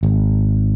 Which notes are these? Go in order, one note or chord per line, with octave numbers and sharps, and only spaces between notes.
G#1